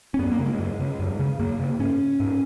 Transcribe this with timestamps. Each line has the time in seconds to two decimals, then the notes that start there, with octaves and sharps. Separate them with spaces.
0.14 C#4
0.19 F#2 B3
0.31 A#3
0.39 C#3
0.46 G#3
0.59 F#2
0.79 C#3
0.99 F#2
1.19 C#3
1.39 F#2 A#3
1.60 C#3
1.79 G#2 C#4
2.20 G#2